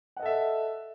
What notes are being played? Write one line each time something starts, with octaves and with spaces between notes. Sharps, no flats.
A4 D#5 E5 F#5